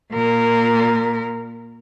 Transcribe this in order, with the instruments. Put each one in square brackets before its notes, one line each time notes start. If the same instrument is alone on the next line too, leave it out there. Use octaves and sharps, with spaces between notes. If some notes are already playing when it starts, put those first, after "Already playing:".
[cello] A#2 A#4